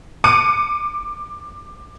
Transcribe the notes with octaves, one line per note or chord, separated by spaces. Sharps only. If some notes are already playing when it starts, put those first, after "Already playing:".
D6 C#7 D#7